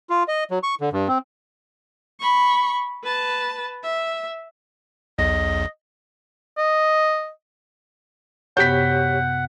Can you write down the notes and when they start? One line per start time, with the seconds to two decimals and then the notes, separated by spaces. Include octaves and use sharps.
0.10 F4
0.28 D#5
0.51 F#3
0.63 C#6
0.81 D3
0.93 G2
1.08 C4
2.20 B5 C#6
3.03 B4 A5
3.84 E5
5.19 B1 E2 D#5
6.58 D#5
8.57 F#2 C3 B3 G4 C#5 F#5 G6 B6